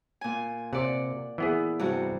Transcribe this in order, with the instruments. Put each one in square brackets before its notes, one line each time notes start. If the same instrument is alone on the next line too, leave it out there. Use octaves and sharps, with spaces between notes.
[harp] A#2 G#5
[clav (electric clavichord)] C3 [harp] D5 F#5
[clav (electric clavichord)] E3 B3 G#4
[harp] G2 C3 F#4